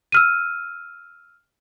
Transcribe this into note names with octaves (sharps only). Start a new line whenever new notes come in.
E6 F6 D#7